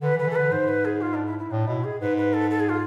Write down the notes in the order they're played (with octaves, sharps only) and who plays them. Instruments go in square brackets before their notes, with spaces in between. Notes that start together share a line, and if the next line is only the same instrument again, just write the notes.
[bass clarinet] D3 [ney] B4
[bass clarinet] E3
[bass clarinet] D3 [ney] B4
[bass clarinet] E3 [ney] A4
[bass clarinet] D3 [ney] B4
[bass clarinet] G#2 [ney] C5
[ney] B4
G#4
F4
D4
E4
E4
[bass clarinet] A2 [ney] D4
[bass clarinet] B2 [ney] E4
[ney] G#4
[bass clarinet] G#2 [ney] B4
[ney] B4
A4
A4
G#4
F4